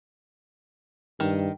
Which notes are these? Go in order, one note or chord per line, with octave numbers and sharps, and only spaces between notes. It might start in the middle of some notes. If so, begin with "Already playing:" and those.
G2 D#3